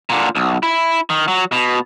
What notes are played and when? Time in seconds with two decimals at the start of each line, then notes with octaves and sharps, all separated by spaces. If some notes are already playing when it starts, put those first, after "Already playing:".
0.10 A#2 D3
0.35 B1
0.63 E4
1.10 D#3
1.28 F#3
1.52 B2